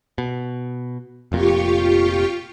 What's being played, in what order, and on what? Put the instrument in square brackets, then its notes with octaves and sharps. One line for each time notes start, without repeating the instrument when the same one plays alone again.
[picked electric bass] B2
[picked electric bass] F1 F2 A#2 [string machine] F4 G4 C#6